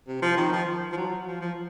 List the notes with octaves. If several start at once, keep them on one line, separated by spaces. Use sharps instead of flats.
C3
F3
D#3
F3
F3
F#3
F3
F3